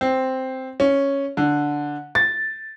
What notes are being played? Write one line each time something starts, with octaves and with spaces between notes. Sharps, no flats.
C4
C#4
D3
A6